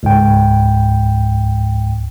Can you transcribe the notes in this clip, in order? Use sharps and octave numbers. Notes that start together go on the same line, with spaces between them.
C#2 G#2 G5